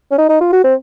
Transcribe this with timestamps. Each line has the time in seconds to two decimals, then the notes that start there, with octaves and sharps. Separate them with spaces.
0.11 C#4
0.18 D#4
0.29 D#4
0.41 F4
0.53 F#4
0.64 C4